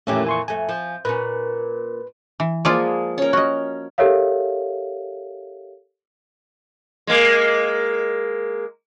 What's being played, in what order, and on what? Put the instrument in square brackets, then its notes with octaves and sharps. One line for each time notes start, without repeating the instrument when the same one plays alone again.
[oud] F2 A#2 E3 [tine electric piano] A3 C#4 G4
[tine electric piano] G#5 C6 C#6
[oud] F2 A3 [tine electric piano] G#5
[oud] F3
[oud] A#2 C#4 [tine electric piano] B4
[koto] E3
[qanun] F3 G#3 A#3 [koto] F4 G#4 D5
[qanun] C#4 A#4
[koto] F#4 D#5
[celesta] G4 A4 A#4 C#5 E5 F5
[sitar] G#3 A#3